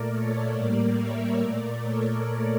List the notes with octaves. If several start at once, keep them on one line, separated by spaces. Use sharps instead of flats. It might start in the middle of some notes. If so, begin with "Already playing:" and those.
Already playing: A#2 A3 A#4 D5
A4 C#5
A2 G3 A#3 A#4 D5
C#5 E5
A#2 A3 A#4 D5
A4 C#5